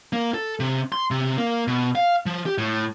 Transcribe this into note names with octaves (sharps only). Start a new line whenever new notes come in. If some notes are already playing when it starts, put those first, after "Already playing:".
A#3
A4
C3
C6
C3
A#3
B2
F5
F3
G4
A2